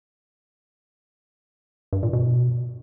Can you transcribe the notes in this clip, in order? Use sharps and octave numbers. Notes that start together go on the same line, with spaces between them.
G2
A#2
B2